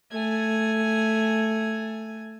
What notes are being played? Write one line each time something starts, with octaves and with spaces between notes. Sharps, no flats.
A3 G#5